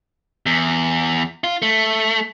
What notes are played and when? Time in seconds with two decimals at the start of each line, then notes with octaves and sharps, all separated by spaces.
0.46 E2
1.44 F4
1.62 A3